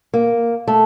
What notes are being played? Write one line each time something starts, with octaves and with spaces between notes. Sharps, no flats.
A#3
A3